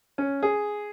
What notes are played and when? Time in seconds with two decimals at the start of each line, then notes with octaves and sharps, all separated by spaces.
0.18 C#4
0.43 G#4